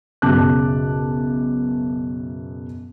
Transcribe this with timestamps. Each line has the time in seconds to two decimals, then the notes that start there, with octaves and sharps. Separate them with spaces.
0.22 B1 F#2 C#3 A5 D6 F#6